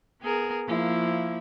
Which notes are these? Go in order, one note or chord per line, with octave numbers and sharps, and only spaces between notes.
B3 G#4 A#4
F3 A#3 E4